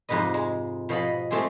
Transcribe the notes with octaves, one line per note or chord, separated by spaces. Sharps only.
F2 G#2 C3 B4 D#5
G#3
B2 F3 D#5 B5
G#3 A3 C4 G4 G#4